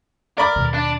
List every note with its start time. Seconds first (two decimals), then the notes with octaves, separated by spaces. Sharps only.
0.38 A#4 D5 B5 D6
0.56 D#2 B2 D#3
0.74 D4